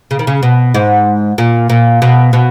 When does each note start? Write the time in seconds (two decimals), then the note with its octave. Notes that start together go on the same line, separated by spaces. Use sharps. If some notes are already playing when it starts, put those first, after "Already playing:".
0.11 C#3
0.19 D#3
0.27 C#3
0.43 B2
0.74 G#2
1.38 A#2
1.70 A#2
2.02 B2
2.33 B2